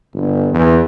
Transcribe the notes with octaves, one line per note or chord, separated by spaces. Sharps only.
G1
E2